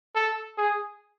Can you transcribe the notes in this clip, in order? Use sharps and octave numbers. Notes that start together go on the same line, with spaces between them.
A4
G#4